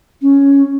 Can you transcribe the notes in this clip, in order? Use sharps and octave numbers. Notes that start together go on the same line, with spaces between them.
C#4